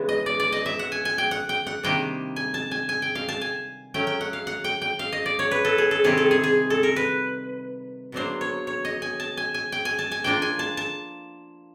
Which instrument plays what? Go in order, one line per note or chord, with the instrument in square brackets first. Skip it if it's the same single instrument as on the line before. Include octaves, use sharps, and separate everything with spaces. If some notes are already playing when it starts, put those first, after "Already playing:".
Already playing: [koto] C#3 E3 G#3 B3
D#5
D5
D5
D#5
E5
F#5
G#5
G#5
G5
F#5
G5
F#5
C3 D#3 G3 A#3 D4 G5
G#5
A5
G#5
G#5
G5
F5
A5
G#5
F#3 A3 C#4 G5
G5
F#5
F5
F#5
G5
G5
F5
D#5
D5
C#5
B4
A4
G#4
A4
C3 D#3 G3 C4 G#4
A4
G#4
G#4
A4
A#4
B4
B2 F#3 A#3 D4 C5
C#5
C#5
D#5
G#5
A5
G#5
G#5
G5
G#5
A5
G#5
F3 A#3 D4 F4 G5
G#5
A5
A5